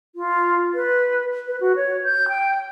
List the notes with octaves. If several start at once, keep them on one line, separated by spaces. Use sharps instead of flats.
F4
B4
B4
F#4
C#5
G6
G5